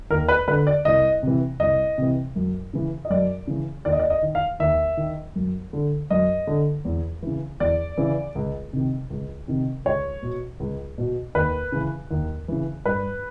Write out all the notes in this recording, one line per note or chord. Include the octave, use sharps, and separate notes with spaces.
D#2 A#4
B4
D3 B4
D5
C2 D#5
C3 E3
C2 D#5
C3 E3
F#2
C#3 E3
D#5
F#2 D5
C#3 E3
D#2 D5
D#5
D5
D#5
D#3
F5
D#2 E5
D#3
F#2
D3
F#2 D#5
D3
E2
C#3 E3
E2 D5
C#3 E3
C#2
C3 D#3
C#2
C3 D#3
C#2 C#5
B2
C#2
B2
D#2 B4
C#3 E3
D#2
C#3 E3
G2 B4